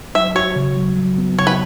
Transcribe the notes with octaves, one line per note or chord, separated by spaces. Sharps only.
F#3 E5
F#4 C#5
C#3
F#3
F#3
B3
C#3 C#5
B4